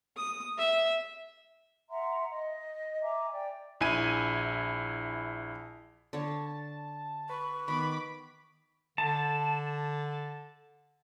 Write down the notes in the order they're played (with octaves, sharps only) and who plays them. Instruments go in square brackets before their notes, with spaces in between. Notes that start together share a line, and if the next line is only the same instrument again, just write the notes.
[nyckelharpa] D#6
E5
[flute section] E5 F#5 A#5 C6
D#5
E5 G#5 A#5 D6
D5 G5
[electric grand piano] A#1 E4 G#5 D#7
[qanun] D3 C#5 [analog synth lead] A5
[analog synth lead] A5
[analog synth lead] B4 [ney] C#6
[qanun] D#3 B3 [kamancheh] B5 D6
[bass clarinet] D3 [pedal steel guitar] A5